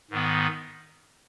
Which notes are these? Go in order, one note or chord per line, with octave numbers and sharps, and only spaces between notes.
G#2 D#3 B3